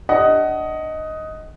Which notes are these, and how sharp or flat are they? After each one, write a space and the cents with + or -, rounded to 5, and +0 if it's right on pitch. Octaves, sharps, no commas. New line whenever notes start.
D4 +0 D#5 +10 F#5 +20